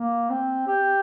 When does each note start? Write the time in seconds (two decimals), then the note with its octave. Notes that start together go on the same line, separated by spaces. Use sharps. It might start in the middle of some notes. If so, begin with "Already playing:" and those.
Already playing: A#3
0.30 C4
0.68 G4